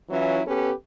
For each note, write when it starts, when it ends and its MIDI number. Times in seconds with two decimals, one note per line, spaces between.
0.10 0.40 52
0.10 0.40 54
0.10 0.40 61
0.10 0.40 64
0.10 0.40 65
0.47 0.72 59
0.47 0.72 61
0.47 0.72 67
0.47 0.72 69
0.47 0.72 71